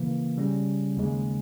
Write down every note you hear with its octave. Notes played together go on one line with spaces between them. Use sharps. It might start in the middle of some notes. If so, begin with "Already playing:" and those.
Already playing: C#3 E3 A#3
C#3 G3 C#4
D#2 C#3 G#3